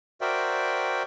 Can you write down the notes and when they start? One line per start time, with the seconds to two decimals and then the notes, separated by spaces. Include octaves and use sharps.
0.21 F#4 A#4 C5 D5 E5 G5